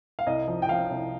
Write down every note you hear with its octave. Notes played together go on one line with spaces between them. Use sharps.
F5
C2 D#5
F3
G5
F3 F5
C2